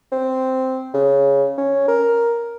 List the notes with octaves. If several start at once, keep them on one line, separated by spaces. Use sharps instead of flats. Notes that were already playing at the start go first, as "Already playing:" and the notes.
C4
C#3
C#4
A#4